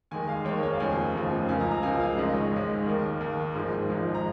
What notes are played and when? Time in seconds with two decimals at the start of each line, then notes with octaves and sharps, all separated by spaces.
0.11 D#2 D#3 G#3 G#5
0.28 F5
0.45 D#2 D#3 G#3 C#5
0.57 A#4
0.63 C#5
0.72 F5
0.79 F1 D#2 C#3 F3 G#5
1.14 F1 D#2 C#3 F3
1.49 C#2 C#3 F3 A#3 G#5
1.60 A#5
1.71 A#5
1.82 C#2 C#3 F3 A#3 G#5
2.00 F5
2.17 G#1 G#2 G#3 D#5
2.28 D#5
2.34 C#5
2.51 G#1 G#2 G#3
2.86 D#2 D#3 A#3 A#4
3.21 D#2 D#3 A#3
3.55 G#1 G#2 F3 G#3
3.89 G#1 G#2 F3 G#3
4.14 A#5